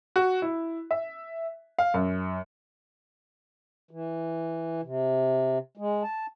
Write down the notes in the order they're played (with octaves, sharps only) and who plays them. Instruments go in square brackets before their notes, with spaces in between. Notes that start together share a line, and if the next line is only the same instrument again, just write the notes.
[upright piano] F#4
E4
E5
F5
F#2
[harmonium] E3
C3
G#3
A5